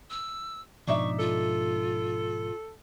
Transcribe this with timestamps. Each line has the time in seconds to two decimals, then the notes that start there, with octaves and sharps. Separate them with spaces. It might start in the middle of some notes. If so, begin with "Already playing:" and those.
0.10 E6
0.88 G#2 B2 F3 D4 D#4 E5 C#6
1.19 F4 A4